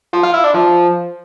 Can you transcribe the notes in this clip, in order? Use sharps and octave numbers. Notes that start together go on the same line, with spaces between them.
F3
F4
E4
D4
F3